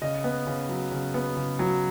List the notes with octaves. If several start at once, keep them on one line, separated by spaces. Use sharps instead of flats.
C#3 D#5
B3
C#3
F#3
C#3
B3
C#3
F#3